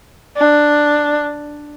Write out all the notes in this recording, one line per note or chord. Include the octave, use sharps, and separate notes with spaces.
D4